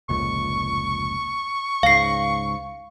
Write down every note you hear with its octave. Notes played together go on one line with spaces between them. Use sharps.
F1 C#2 A#2 C#6
C#2 G#2 F5 C7